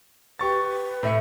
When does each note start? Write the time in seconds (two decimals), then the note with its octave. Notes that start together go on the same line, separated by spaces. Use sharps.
0.39 G4 B4 C#6 A6
1.03 A2 E5 C#7